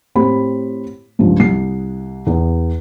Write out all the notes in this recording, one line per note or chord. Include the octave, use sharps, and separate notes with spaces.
A2 C4 G4 B5
C#2 G2 F3
C2 C7
E2